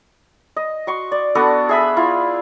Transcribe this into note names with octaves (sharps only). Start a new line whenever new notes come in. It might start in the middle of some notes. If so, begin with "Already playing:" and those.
D#5
F#4 C6 C#6
D5
B3 D4 F#4 A4
G#4 E5 B5
E4 F4